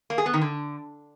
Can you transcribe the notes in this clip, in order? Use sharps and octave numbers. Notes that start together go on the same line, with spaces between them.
A#3
G#4
B3
D#3
D3